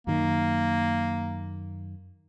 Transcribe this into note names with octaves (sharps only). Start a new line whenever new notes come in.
F#2 D#3 A#3